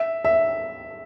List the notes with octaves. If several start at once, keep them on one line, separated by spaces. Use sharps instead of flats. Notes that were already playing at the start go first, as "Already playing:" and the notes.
Already playing: E5
E5